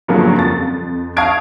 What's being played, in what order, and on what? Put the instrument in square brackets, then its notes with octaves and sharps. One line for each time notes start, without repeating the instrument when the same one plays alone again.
[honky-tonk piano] G2 A#2 C#3 F3 F#3 A#3
F2 A6
F5 A5 C#6 D#6 G#6 D7